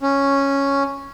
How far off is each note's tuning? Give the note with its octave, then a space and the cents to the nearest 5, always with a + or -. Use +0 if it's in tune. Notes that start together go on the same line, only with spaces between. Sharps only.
C#4 -5